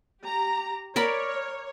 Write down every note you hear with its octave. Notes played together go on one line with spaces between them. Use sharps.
G4 A#5
A#4 C#5 D5 B5